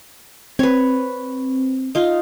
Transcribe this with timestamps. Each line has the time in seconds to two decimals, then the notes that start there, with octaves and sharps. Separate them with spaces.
0.59 C4 B4 C#5
1.95 D#4 F4